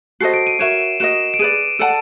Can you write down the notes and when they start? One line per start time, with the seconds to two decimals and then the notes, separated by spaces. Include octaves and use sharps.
0.20 F#4 A4 C5 D#5 C7
0.34 D7
0.47 D#7
0.59 F#4 A#4 C#5 E5 E7
1.00 F#4 A#4 D#5 E7
1.34 D7
1.39 G#4 B4 D5 D#7
1.79 A4 D5 F#5 A5